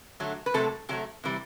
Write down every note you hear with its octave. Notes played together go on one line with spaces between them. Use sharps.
D3 F#3 A3
B4
C3 F#3 A3 A4
C3 F#3 A3 G4
C3 E3 G3